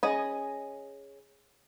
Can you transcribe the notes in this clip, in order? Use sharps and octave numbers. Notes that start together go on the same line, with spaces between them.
C#4 G#4 D#5